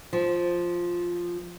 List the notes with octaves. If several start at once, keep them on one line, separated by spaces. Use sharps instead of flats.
F3